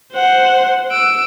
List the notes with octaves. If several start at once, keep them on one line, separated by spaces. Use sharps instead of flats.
C5 F#5
E6 D7